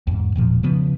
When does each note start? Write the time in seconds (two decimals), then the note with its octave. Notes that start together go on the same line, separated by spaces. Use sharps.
0.07 E2 G#2
0.36 E1 A#2 F3
0.63 C#3 F3 B3